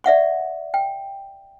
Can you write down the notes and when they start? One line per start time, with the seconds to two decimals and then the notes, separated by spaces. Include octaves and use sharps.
0.04 D5 E5 F#5 C#6
0.74 G5